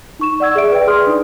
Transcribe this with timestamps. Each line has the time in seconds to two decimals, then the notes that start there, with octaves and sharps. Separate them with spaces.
0.19 D#4 C#6 E7
0.40 D5 F#5 E6 G#6
0.55 G#4 D5 E5 D7
0.72 B4 G5
0.87 G#4 D5 C6 D#6 F6
1.07 D4 D#4